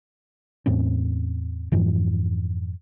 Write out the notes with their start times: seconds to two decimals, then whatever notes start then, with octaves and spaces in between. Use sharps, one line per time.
0.66 E2 A2 C4 C#4
1.72 F2 G#2 E3